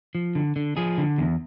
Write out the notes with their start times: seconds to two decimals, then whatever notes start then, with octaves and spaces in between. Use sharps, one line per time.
0.15 F3
0.35 D3
0.56 D3
0.77 F3 G#4
0.98 D3
1.18 E2